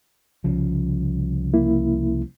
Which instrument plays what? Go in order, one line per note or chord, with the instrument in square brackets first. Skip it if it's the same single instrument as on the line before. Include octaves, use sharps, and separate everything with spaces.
[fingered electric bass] C2 C#3 F3
[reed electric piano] A#3 E4